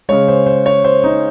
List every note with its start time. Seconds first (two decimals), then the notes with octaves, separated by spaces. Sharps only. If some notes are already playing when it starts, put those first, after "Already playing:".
0.09 C#3 G#3 C#5
0.28 C5
0.46 C5
0.66 C#5
0.84 C5
1.04 D#4